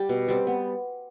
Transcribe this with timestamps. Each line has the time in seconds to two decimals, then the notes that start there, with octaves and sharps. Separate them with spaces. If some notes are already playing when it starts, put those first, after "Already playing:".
Already playing: G3 G4
0.09 B2
0.28 G3 C4 G4
0.47 B3